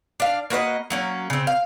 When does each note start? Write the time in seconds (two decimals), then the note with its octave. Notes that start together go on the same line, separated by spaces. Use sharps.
0.20 D4 F5
0.50 A#3 F#4 B4 D#5
0.90 F#3 A#3 C#4
1.30 C#3 C4
1.47 F5